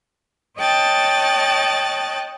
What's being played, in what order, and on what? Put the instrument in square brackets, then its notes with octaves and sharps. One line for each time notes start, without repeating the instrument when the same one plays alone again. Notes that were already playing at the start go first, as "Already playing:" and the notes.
[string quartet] C#5 D#5 G5 A5 F#6 A6